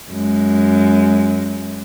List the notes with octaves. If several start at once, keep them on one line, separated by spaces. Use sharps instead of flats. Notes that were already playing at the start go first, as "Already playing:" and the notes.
F#2 G#3